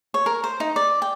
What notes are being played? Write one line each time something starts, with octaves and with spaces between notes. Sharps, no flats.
C#5
A#4
C5
D#4
D5
G5